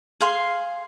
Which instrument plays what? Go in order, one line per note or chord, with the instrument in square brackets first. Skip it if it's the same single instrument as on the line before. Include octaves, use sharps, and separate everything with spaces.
[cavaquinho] G#4 F5 C6